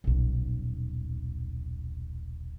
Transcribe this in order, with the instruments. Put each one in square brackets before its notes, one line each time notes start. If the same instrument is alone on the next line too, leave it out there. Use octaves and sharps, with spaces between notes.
[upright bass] D#1 B1